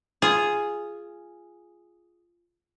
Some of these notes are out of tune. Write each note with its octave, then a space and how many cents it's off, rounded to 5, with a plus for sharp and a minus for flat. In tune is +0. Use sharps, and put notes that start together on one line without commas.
F4 -10 G#4 +0